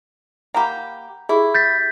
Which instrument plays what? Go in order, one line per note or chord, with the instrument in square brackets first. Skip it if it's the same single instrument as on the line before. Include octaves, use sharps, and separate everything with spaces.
[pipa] A#3 G4 [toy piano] F#5 A#5 B5
[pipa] E4 [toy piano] G4 G#4
[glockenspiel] G6 A6 B6